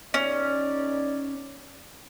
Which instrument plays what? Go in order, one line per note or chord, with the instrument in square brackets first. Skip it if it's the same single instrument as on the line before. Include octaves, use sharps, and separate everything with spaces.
[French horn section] D#2 D#4 D5 [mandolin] C#4